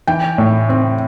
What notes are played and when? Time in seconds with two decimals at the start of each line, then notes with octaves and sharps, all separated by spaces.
0.07 E3 G5
0.38 A2
0.69 C4